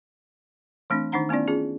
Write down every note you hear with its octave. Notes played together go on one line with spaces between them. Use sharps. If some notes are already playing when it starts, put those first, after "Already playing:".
E3 A3 C4 D4
D#3 D4 D#4 F#5 A#5
A3 B3 C#4 E4 D5
C#4 F4 G#4